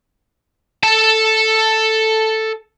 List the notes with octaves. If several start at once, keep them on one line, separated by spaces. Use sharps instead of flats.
A4 A5